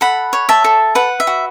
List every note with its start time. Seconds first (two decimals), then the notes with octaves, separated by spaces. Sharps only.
0.01 A4 F#5 B5
0.33 C#5
0.49 E5 A5
0.64 A4
0.95 B4 F#5
1.20 E5
1.27 F#4